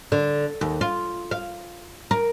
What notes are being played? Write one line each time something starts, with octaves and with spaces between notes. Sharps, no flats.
D3
D#2
F4
F5
A#4